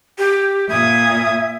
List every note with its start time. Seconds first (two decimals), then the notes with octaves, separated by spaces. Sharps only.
0.18 G4
0.69 A#2 E5 D#6 G#6